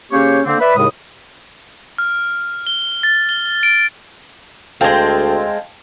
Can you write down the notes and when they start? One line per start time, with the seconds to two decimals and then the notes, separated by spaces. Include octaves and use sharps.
0.12 C#3 A#3 C#4 G4 C5 C#5
0.45 D3 A#3 C4
0.60 B4 D5 E5 B5
0.76 D#2 A2 C#3 G#3 D#6
1.98 F6
2.67 G7
3.03 A6
3.29 G7
3.63 D7
4.81 D2 G#3 C4 F5 G5 A5